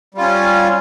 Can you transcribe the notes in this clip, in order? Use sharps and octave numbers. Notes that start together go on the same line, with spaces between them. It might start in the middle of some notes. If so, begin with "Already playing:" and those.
G3 C#4 F4